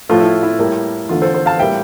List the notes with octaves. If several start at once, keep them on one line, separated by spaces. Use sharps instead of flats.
A2 F3 A3 F4
E4
E4
A2 G3 A#3
E2 D3 A3 F4
A4 C5
A4 C5
F5 A5
A2 G3 A#3 E5 G5